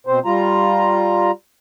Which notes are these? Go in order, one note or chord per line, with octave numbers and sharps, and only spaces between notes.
B2 C4 C5
G3 F4 A#5